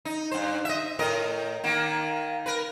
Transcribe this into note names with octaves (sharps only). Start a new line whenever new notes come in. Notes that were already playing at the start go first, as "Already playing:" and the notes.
D#4
G2 C5
D#5 E5
A2 A#4 D#5
D#3 A#3
A#4 B4